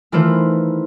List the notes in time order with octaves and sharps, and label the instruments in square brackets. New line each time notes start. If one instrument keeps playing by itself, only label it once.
[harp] D#3 E3 A3 E4 F4 C5